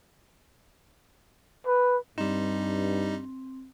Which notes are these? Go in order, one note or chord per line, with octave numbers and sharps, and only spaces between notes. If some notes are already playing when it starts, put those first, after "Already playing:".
B4
G2 G3 C4 D#4